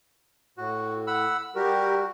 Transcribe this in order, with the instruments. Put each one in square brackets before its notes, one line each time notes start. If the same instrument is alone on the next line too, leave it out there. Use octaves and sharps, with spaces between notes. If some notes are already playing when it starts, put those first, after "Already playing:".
[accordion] A2 [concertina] F#4
[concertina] F#5 B5 E6
[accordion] G3 G4 A#4 [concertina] F#4